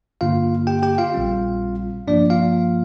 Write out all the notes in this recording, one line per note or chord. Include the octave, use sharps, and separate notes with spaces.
G2 D3 A#3 F4 F5
G4 G5
G4 G5
F4 F5
A#1 A#2 G3 C4
G2 F3 A#3 D4 F4 D5
F4 F5